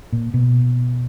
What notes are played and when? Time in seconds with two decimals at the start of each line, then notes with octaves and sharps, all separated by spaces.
0.12 A#2
0.34 B2